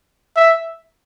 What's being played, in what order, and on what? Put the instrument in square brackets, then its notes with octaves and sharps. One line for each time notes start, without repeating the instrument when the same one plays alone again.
[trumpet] E5